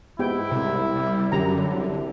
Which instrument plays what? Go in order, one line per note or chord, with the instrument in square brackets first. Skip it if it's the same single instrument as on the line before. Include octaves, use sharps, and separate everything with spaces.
[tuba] G#2 [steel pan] B3 G4 G5 [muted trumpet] E4
[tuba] C2 [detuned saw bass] C3
[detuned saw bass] G3
[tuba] F#2 [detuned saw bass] D3 [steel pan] G4 A#5
[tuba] C2